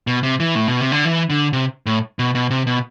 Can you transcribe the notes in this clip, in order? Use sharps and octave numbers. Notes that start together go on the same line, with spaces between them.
B2
C3
E3
A2
B2
C3
D3
E3
D3
C3
A2
B2
B2
C3
B2